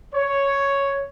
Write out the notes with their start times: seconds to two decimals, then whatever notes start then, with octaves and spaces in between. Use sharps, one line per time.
0.14 C#5